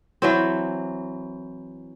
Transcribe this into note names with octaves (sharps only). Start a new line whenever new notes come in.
E3 F#3 C4